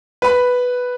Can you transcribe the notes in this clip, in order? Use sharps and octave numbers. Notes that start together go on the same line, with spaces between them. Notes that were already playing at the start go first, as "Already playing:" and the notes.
B4 B5